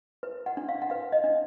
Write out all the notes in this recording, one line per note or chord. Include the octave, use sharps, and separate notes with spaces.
B4
F#5
D4
F5
F#5
B4 F5
D#5
D4